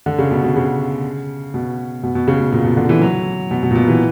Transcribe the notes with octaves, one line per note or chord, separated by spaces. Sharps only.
D3
C#3
B2
B2
C#3
B2
B2
B2
C#3
B2
A#2
B2
D3
E3
F#3
B2
B2
A#2
B2
E3